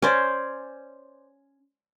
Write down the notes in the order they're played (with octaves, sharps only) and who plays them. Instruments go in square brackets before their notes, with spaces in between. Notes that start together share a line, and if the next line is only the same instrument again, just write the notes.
[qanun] C#4 C5 D5